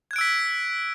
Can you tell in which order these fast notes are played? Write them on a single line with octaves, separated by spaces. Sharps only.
G#6 F#6 D7 E6 B6